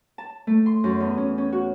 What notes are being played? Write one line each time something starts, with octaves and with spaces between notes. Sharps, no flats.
A5
A3
C6
F#2
E2
C#4
C#4
F#4